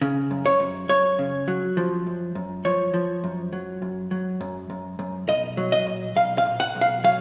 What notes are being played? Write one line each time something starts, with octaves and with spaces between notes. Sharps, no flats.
C#3
F#2
C#5
F#2
F#2 C#5
C#3
F#3
F3
F#2
F#2
F3 C#5
F3
F#2
F#3
F#2
F#3
F#2
F#2
F#2
B1 D#5
F#3
D#5
A#2
B1 F5
F5
A#2
F#5
B1
F5
F#3 F5